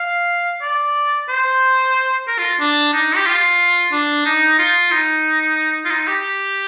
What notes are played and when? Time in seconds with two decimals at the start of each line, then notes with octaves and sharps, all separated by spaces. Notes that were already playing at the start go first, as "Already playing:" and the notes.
Already playing: F5
0.62 D5
1.29 C5
2.28 A#4
2.38 F4
2.60 D4
2.93 D#4
3.16 G4
3.26 F4
3.92 D4
4.25 D#4
4.59 F4
4.91 D#4
5.85 F4
5.90 D#4
6.07 G4